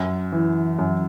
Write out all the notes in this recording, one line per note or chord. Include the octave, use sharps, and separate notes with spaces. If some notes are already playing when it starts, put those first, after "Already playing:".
Already playing: F#2
E3
F#2